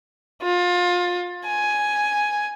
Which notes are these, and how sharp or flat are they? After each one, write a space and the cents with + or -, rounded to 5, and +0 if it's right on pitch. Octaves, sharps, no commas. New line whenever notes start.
F4 +25
G#5 +5